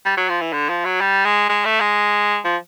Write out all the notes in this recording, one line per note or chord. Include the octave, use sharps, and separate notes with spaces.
G3
F#3
F3
E3
D3
F3
F#3
G3
G#3
G#3
A3
G#3
F3